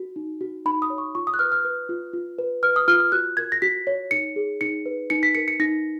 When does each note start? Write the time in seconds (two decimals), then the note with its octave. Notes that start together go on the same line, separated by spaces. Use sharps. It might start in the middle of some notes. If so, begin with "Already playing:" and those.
Already playing: F#4
0.16 D#4
0.41 F#4
0.65 D#4 B5
0.82 D#6
0.90 C#5
0.98 C#6
1.15 F4 C#6
1.27 D#6
1.34 F#6
1.39 B4 F6
1.52 F6
1.65 B4
1.89 F4
2.13 F4
2.38 B4
2.63 B4 F6
2.76 D#6
2.88 F4 F6
3.00 F6
3.12 F#4 F#6
3.37 A#4 G#6
3.52 A#6
3.62 F#4 B6
3.87 C#5
4.11 D#4 C#7
4.36 G#4
4.61 D#4 C#7
4.86 B4
5.10 D#4 C#7
5.23 B6
5.35 A#4 C#7
5.48 C#7
5.60 D#4 A#6